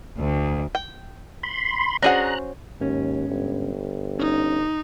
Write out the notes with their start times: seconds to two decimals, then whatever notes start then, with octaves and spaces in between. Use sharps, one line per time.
0.19 D2
0.75 G5
1.43 B5 C6
2.02 C#4 D4 F#4 G#4 C5 F#5 A#5 F#6
2.80 D#2 G#2 C#4
3.29 G1
4.19 C#4 D#4